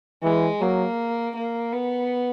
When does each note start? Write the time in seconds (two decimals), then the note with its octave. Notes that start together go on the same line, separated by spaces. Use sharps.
0.23 E3 G#3
0.60 F#3 A#3
1.35 A#3
1.72 B3